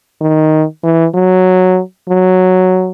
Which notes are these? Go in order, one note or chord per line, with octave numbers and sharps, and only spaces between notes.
D#3
E3
F#3
F#3